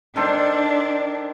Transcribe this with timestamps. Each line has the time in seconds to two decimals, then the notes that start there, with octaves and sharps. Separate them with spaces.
0.16 D#3 D4 A4 C5